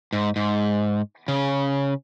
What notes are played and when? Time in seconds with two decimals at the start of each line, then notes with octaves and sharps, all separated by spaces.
0.13 G#2
0.36 G#2
1.28 C#3